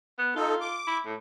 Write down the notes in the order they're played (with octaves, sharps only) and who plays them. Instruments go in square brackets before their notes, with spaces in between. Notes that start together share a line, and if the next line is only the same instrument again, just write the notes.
[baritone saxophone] B3
[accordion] D#4 A4 [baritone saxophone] F4
[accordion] D6
[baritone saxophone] E4
A2